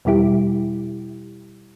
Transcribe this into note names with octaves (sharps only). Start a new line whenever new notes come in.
E2 B2 G3 E4 G4